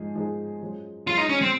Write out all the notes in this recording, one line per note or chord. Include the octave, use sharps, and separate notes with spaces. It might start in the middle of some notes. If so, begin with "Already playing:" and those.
Already playing: G#2 F3 G#3 D#4 G#4
G#2 F3 G#3 D#4 G#4
F#2 F3 G#3
F#2 F3 G#3 F4
D#4
C#4
C4